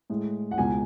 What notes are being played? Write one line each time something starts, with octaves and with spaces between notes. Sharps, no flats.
A2 G#3
F#5
C#2 B2 G#3 G#5